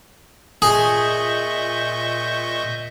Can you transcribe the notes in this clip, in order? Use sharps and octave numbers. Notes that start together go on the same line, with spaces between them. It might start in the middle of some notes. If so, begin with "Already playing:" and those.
A#2 G#4 D#5 E5 C#6 G6